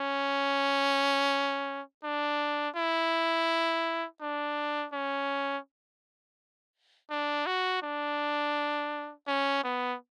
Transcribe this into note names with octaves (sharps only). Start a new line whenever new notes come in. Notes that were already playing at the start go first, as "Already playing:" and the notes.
Already playing: C#4
D4
E4
D4
C#4
D4
F#4
D4
C#4
B3